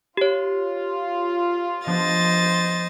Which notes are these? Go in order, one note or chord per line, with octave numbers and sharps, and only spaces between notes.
F4 G4 C#5
F3 B3 D4 C5 D#5 A6